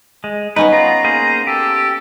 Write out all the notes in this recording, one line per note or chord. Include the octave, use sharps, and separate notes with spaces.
G#3
B3 C#4 D#4 B4
F4 A#5
A#3 G#4 C5
G4 A4